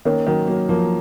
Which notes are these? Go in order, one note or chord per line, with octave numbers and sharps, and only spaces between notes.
D#3 A#3 C#4
D#3 F#3
F#3 A#3
F3 A#3